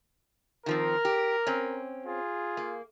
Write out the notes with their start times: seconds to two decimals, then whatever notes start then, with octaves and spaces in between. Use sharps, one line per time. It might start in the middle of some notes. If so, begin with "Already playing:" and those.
0.66 D#3 F3 C4 A#4
1.05 G4
1.47 C4 C#4
2.05 F4 G#4
2.57 A#3